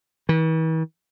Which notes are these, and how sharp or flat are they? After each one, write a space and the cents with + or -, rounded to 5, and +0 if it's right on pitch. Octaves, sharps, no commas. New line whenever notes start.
E3 -45